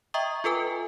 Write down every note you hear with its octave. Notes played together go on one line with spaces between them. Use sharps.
D#5 E5 G5 A#5 C#6 D#6
F4 A4 B4 G#5